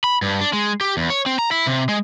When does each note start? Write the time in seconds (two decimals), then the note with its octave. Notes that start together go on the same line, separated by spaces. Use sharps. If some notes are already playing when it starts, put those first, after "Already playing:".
0.04 B5
0.22 G2
0.41 D4
0.53 G#3
0.81 G4
0.97 E2
1.10 C#5
1.26 C4
1.39 A#5
1.51 E4
1.67 C3
1.89 G#3